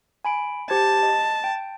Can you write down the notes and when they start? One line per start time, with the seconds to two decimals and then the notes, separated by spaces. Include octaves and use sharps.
0.25 G#5 B5 D7
0.70 G4 C5 A5 G#6
1.03 D#5
1.44 G5